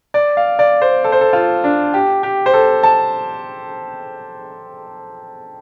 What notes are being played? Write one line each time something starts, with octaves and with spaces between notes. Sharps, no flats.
D5
F5
D5
C5
A4
C5
A4
F4
D4
G4
G4
C5
A4
A5